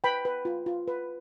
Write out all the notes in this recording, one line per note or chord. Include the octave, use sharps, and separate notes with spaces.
B4 G5 B5
B4
F4
F4
B4